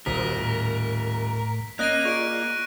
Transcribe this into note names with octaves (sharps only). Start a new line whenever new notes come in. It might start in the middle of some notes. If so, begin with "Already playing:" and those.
D#1 F#4 A#4 C5 D#6 B6
A2
A#3 C#4 D#5 F#6 A#6 D#7
F4 G#4 D5 C#6 D7